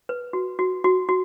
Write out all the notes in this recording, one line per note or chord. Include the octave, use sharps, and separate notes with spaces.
B4
F#4
F#4
F#4
F#4